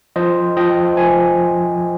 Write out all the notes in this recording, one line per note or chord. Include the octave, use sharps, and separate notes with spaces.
F3 C5 D#5
F3 D#5 G5
F3 G#5